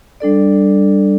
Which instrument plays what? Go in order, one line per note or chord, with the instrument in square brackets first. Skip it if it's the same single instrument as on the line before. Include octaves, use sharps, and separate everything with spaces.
[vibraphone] G3 D4 A4 D5